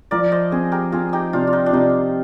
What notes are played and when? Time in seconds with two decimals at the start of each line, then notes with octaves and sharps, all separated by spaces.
0.11 F3 A#4 D5
0.32 C5 D#5
0.52 C4 G#4 C5
0.72 G4 A#4
0.92 C4 F4 G#4
1.13 D#4 G4
1.33 C3 D4 F4
1.47 F4
1.53 D#4
1.66 D4
1.73 C3 D#4